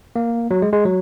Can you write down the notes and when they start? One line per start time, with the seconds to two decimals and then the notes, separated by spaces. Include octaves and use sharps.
0.16 A#3
0.51 F#3
0.62 G#3
0.73 G#3
0.85 F#3